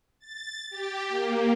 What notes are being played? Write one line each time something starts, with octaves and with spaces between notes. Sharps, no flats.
A6
G4
A#3